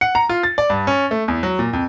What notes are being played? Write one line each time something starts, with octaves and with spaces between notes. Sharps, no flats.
F#5
A#5
F4
A6
D5
G2
C#4
A3
E2
F#3
A#2
F2